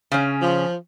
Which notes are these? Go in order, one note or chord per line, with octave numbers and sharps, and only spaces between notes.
C#3 C#4
F3